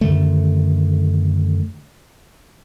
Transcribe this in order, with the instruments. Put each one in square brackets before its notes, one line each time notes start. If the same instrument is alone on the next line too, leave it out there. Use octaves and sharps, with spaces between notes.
[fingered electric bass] F#2 D3 D#3 A3